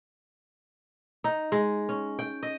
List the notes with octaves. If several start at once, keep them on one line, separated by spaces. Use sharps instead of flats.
D#4
G#3
C#4
G5
D#5